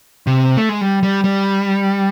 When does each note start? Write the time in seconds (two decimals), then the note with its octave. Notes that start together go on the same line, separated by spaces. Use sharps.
0.27 C3
0.57 A3
0.69 G#3
0.81 G3
1.03 G3
1.24 G3